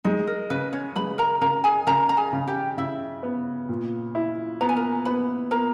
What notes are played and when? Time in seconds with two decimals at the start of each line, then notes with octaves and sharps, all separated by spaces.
0.04 G#3 D#4
0.27 A#4
0.50 C#3 B4
0.73 C#4 C#5
0.96 G#3 B4 B5
1.18 A#4 A#5
1.41 C#3 A#4 A#5
1.64 G#4 G#5
1.87 C#3 A#4 A#5
2.09 A#5
2.17 G#4 G#5
2.33 C#3
2.47 G4 G5
2.78 C#3 E4 E5
3.23 B3
3.69 A#2
4.15 E4
4.61 B3 A#5
4.69 G#5
4.76 A#4 A#5
5.05 B3 B4 B5
5.51 B3 A#4 A#5